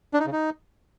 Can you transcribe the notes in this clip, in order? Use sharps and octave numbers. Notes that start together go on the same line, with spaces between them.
D4
D#4
C#3
D#4